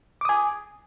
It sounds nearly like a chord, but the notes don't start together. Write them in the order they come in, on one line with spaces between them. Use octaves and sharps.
D6 D#6 G#5